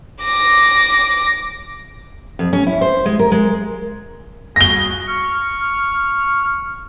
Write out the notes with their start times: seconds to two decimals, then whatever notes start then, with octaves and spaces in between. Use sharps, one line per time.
0.23 D6 A#6
2.39 F2
2.53 C#4
2.67 E4
2.81 C5
3.06 G#3
3.19 A#4
3.32 G#3
4.56 G3 F#4 G#4 A#6 G7
5.08 C#6 F6